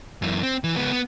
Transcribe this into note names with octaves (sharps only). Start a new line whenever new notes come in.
F#2 E3
C4
E3
C#2 B3
B3